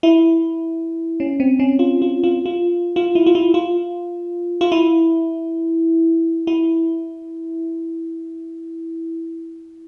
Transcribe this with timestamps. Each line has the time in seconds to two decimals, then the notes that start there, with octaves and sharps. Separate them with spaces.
0.03 E4
1.20 C#4
1.40 C4
1.59 C#4
1.79 F4
2.02 F4
2.24 F4
2.46 F4
2.96 F4
3.15 E4
3.26 F4
3.35 E4
3.54 F4
4.61 F4
4.72 E4
6.47 E4